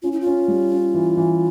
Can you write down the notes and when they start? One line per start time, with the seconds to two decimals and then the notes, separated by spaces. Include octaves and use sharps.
0.03 C#4 F4
0.12 E4
0.21 F4
0.26 C#4
0.48 G3
0.72 C#4
0.94 E3
1.17 E3